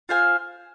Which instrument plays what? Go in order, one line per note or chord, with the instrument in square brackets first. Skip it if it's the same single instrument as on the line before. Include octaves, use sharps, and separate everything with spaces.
[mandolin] F4 C5 F5 G#5